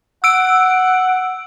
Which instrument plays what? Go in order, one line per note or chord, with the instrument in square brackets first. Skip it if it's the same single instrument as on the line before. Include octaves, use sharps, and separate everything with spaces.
[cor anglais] F#5 [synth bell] E6 D7